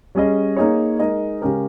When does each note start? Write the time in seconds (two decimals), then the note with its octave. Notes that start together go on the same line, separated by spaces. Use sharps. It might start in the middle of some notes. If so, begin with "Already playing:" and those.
0.15 G3 C#4 G#4 D#5
0.57 A#3 D#4 G#4 C#5
0.99 G#3 D#4 A#4 D#5
1.42 C#3 G#3 C#4 G4 A#4